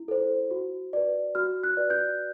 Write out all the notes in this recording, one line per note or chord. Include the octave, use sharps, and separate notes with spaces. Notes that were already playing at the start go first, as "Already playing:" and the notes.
Already playing: E4
A4 C5
F#4
B4 D5
F#4 F6
F#6
B4 D5
G6